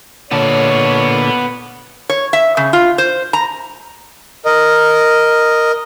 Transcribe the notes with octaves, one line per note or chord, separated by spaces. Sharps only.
A#2 D3 B3 C#5 A5
C#5
E5
C#3
F4
C5
A#5
A#4 D#5